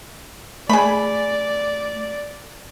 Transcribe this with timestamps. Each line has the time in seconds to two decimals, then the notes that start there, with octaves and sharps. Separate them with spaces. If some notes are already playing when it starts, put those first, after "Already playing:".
0.69 A3 G#4 D5 B5